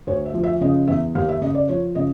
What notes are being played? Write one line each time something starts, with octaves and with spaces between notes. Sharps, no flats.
D2 C#5
E5
F3
E5
C#3 D#5
E2 E5
D#2 F5
E5
C#3 D#5
D5
F3 C#5
C#3 D#5